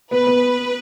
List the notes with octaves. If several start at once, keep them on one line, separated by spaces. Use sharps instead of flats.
B3 B4
B3